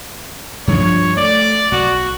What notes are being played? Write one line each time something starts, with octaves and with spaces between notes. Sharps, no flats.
G2 F3 D4 C#5
A3 D5
B1 F#4